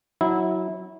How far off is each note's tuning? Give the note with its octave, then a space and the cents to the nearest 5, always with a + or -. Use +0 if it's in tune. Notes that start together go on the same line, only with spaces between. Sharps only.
F#3 +0 E4 -20